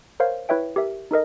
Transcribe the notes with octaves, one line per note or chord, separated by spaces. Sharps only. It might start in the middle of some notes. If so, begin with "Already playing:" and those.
A#4 C5 C#5 F5
E4 B4 C#5 E5 G5
G4 A#4 E5
D#4 A4 A#4 D#5